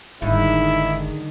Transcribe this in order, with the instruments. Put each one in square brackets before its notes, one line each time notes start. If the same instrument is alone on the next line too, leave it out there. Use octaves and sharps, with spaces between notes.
[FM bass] F#1 [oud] G#2 [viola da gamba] D3 D#3 D#4 [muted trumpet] E4